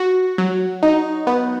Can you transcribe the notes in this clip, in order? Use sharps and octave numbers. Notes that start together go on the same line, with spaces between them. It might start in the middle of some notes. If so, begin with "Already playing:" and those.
Already playing: F#4
F#3
D#4
B3